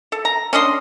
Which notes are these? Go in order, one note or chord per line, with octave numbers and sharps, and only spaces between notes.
A4
A#5
C#4 D4 D#5 C6